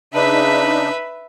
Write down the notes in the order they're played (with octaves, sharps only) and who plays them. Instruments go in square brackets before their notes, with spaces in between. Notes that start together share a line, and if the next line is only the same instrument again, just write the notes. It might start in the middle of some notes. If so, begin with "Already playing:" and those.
[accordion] C#3 D4 D#4 [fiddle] B4 E5